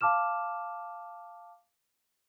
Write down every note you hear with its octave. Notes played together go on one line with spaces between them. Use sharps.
F5 A5 D6 F6 E7